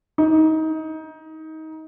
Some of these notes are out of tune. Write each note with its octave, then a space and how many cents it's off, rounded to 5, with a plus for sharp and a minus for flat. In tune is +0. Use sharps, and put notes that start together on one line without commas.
D#4 +25